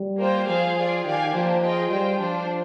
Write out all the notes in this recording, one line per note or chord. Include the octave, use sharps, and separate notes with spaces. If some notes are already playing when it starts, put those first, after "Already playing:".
Already playing: G3
A#3 F4 C5 G5
F3 F4 G#4 C5 F5
F4 G#4 D5
D#3 G4 D5 F5 G#5
F3 A#3 D4 G4 C5
F4 G#4 D#5 G5
G3 F4 C5 G5
F3 D4 F4 C5